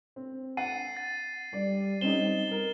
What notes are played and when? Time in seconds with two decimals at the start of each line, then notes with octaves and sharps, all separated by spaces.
0.16 C4
0.57 F#5 A6 C7 D#7
0.97 A6
1.53 G3 D5
2.01 C4 C#4 D#4 E7 G7
2.51 A#4